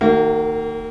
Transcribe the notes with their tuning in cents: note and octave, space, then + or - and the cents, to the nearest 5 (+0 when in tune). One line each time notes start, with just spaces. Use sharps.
D#3 +0 A#3 -35 F#4 +20